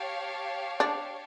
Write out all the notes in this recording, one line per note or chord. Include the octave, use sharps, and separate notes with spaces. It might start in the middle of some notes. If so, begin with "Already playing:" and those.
Already playing: G4 C#5 F5 A5
D4